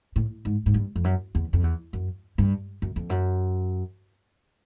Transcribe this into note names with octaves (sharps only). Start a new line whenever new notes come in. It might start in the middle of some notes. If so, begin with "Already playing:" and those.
A2
G#2
G#2
G2
F2
F#2
E2
F2
E2
F#2
G2
F#2
F2
F#2